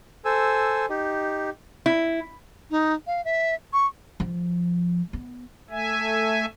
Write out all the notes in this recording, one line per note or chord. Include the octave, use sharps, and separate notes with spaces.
A4 C5 G#5 E6
D#4 G4
E4
D#4
F5
E5
C#6
F3
B3
A3 E5 G#5